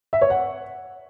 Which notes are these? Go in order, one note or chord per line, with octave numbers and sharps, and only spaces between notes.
E5
C#5
F#5